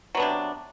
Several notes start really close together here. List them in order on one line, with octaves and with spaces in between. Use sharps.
F#3 B3 D4 C3